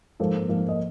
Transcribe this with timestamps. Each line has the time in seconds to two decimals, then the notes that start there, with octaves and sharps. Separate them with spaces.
0.20 G#2 F3 A#3 A4
0.48 G#2 F3 A#3
0.69 D#5